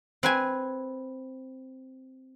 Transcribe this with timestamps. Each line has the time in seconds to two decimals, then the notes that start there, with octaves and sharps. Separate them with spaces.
0.23 C4 B4 G#5